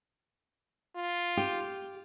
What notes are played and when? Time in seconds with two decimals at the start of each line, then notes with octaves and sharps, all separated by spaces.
0.96 F4
1.37 G4